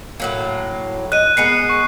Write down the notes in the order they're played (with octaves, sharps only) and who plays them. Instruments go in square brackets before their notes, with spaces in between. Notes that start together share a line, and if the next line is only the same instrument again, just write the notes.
[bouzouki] A2 F#3 A#3
[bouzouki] D#5 [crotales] F#6 D#7
[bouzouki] G#3 B3 A#4 [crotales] C7 C#7 D#7
[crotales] C#6